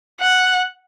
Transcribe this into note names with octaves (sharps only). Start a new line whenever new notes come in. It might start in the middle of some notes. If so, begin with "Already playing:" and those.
F#5